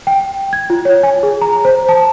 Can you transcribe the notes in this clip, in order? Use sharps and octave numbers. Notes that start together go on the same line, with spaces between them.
G5
G#6
F4
C#5
G#5
G#4
A#5
C5
A5